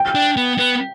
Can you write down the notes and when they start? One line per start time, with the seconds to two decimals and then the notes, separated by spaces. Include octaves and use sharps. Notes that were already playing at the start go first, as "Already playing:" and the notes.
Already playing: G5
0.15 D4
0.37 B3
0.59 B3